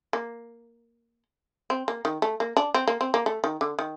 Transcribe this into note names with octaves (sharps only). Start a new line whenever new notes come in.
A#3
C4
A#3
D#3
A3
A#3
D4
C4
A#3
C4
A#3
A3
D#3
D3
D#3